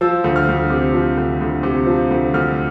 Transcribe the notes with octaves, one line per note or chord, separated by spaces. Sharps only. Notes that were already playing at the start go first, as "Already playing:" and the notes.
F3 E6
D2
F6
D2
C3
F3
D2
D2
C3
F3
D2
D2 F6